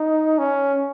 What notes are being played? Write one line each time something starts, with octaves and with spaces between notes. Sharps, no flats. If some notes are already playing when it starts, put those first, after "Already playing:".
Already playing: D#4
C#4